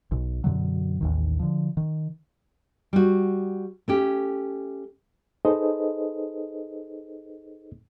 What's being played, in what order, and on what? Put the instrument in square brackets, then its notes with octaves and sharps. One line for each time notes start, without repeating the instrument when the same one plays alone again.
[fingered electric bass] B1 B2
F#2 B2 D3 F#3
A1 D#2 D#3
D3 F3
D#3
[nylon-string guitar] G3 F#4
A3 C#4 G4
[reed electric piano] D#4 G#4 A4 B4 C5 D#5